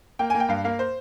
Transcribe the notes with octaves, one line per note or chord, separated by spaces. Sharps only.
A#3 G5
G#5
A#3
G5
G2 F5
A#3 F5
C5